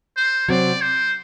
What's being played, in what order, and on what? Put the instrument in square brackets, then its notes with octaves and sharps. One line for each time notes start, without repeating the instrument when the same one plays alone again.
[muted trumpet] C5
[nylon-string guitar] C3 F#3 C4 [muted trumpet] D5
[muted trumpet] C5